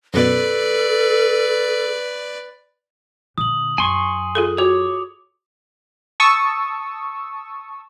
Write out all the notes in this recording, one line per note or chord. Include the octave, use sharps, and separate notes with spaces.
F#2 B2 A4 B4 D5
A#2 D3 D#6 F#7
F#2 G#5 C6 C#6
F4 G#4 A4
F#4 C#5 D6
A5 C#6 D#6 E6